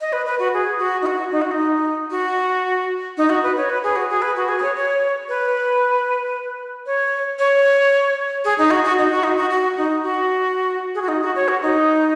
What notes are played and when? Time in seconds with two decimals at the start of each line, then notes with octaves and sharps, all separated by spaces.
0.01 D#5
0.13 B4
0.26 B4
0.39 F#4
0.53 G#4
0.79 F#4
1.02 D#4
1.06 F#4
1.31 D#4
1.42 F#4
1.51 D#4
2.11 F#4
3.18 D#4
3.30 F#4
3.43 B4
3.57 C#5
3.70 B4
3.84 G#4
3.96 F#4
4.10 G#4
4.22 B4
4.36 F#4
4.48 G#4
4.58 B4
4.62 C#5
4.76 C#5
5.29 B4
6.86 C#5
7.39 C#5
8.45 G#4
8.58 D#4
8.71 F#4
8.84 F#4
8.98 D#4
9.11 F#4
9.24 D#4
9.37 F#4
9.50 F#4
9.77 D#4
10.03 F#4
10.95 G#4
11.02 F#4
11.08 D#4
11.22 F#4
11.36 C#5
11.48 F#4
11.62 D#4